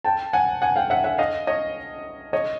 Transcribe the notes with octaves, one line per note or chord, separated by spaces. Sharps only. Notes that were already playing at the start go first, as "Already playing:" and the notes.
G5 A5
F#5 G#5
F#5 G#5
F5 G5
E5 F#5
E5 F#5
D#5 F5
C#5 D#5
C#5 D#5